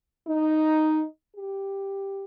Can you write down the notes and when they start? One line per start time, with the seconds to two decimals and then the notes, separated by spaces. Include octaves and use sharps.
0.27 D#4
1.36 G4